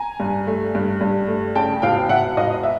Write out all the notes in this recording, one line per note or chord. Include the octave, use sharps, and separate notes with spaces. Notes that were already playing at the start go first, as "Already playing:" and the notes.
Already playing: G#5 A#5
G2
A3
G2
G2
A3
C#3 G5 A5
E1 F5 G5
E1 E5 F#5
E1 D#5 F5
E5